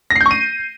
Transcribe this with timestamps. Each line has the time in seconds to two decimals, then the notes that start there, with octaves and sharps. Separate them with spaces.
0.10 A#6
0.16 C7
0.21 G6
0.26 C#6
0.31 D#7